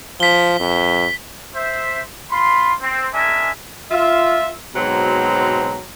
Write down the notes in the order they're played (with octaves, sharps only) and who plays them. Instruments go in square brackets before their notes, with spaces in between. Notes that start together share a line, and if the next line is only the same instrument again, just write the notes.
[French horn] F3 [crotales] B6 G7
[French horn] F2
[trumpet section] C5 E5
F4 B5 C6
C4
G#3 D4 A#4 E5 G#5
[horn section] F4 E5
G#2 B2 F#3 C4 A#5